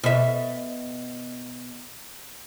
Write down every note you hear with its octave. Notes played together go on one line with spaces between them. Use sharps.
B2 E5